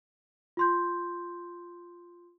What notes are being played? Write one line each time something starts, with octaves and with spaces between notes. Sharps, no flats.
F4 C6 G6